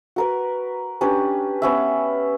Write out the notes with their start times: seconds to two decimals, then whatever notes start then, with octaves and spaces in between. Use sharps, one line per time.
0.16 F#4 A#4 B4
1.01 C#4 D4 G4 B4
1.62 B3 C#4 E5